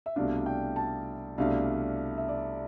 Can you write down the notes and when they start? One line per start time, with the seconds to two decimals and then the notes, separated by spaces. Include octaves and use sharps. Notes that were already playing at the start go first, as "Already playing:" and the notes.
0.06 E5
0.16 C2 B2 A3 D4 F5
0.46 G5
0.76 A5
1.38 C2 B2 A3 D4 F5
2.18 E5
2.29 D5